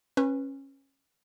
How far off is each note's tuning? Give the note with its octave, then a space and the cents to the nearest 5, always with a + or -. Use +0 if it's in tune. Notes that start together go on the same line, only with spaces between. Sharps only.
C#4 -20 B4 +0